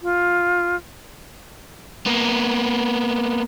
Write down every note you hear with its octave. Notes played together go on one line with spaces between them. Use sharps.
F4
A#3 B3